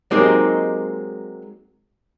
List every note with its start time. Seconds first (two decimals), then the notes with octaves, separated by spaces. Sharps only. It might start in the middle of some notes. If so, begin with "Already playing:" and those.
0.11 F#3 G#3 A#3 C4 D#4 G4